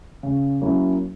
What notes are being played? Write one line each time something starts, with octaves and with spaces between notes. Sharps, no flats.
C#3
F#3 A#3 C#4 E4